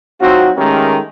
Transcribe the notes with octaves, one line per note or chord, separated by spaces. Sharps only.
F#3 C4 D#4 F4 F#4
D#3 G#3 A3 C#4 G4 A#4